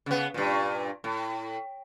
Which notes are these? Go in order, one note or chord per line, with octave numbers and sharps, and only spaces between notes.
C#3 B3
G2 A#2
A2